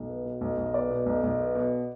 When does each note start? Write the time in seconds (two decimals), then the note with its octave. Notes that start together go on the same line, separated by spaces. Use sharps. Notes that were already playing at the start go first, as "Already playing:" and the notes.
Already playing: B1
0.09 B3
0.25 B2
0.41 B1
0.57 B1
0.66 D#5
0.74 B3 D5
0.90 B2
1.06 B1
1.23 B1
1.40 B3
1.55 B2